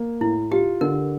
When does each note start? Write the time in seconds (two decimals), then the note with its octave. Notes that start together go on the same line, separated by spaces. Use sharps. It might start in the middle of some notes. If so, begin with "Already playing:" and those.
Already playing: A#3
0.21 A2 E4
0.51 F4 G4
0.81 D3 A#4